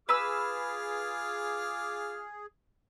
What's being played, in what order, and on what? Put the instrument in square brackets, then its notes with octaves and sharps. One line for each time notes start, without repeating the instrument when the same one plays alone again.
[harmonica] F4 D6 F6 [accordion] G#4 [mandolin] B4 E6